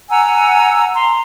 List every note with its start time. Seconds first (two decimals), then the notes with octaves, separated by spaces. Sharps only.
0.09 F#5 G#5 A#5 E6
0.94 A#5 C6